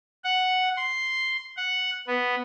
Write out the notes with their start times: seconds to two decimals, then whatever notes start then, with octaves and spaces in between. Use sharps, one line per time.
0.24 F#5
0.77 C6
1.57 F#5
2.07 B3